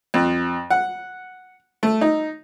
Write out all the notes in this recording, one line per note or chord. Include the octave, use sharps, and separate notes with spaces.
F2
F#5
A3
D#4